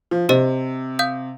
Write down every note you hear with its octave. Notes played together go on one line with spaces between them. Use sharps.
F3
C3 G4 C5 D#5
F5 D#6 G6